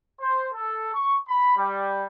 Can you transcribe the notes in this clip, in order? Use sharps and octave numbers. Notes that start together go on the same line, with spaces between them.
C5
A4
C#6
B5
G3